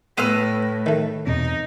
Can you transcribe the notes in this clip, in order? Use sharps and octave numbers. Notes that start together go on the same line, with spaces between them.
A2 B3 B4 C5 E6 F6
D#3 A3
E2 B2 C4 D#4